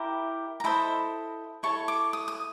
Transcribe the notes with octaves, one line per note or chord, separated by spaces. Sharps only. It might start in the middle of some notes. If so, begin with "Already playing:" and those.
Already playing: E4 G4 A#4
A#5
E4 A4 C5 D#5 B5
E4 A4 C#5 C#6
D6
D#6
D#6